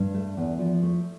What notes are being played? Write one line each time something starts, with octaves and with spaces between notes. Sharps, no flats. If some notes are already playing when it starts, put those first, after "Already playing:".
Already playing: G2 D4
A3
E2
F3
A3